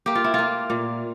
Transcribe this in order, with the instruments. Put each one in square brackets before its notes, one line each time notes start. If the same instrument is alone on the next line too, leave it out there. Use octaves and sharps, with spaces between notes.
[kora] A#3 G4
F4
E4
A#3 F4
A#2